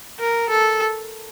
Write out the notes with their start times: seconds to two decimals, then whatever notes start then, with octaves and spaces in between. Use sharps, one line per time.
0.19 A#4
0.50 A4